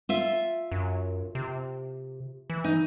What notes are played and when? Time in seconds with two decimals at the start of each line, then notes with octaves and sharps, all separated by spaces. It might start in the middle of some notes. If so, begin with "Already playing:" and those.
0.09 F4 E5
0.72 F#2
1.35 C3
2.50 E3
2.64 D#4